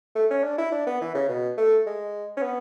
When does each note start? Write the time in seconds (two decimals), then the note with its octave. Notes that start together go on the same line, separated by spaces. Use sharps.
0.15 A3
0.30 C#4
0.44 D4
0.58 E4
0.72 D4
0.87 B3
1.01 E3
1.15 C#3
1.29 B2
1.58 A3
1.87 G#3
2.37 C#4
2.42 B3